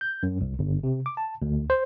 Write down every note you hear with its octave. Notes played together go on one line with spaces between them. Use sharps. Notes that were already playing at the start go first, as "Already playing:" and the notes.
G6
F#2
C2
G1
C3
D6
A5
D2
C5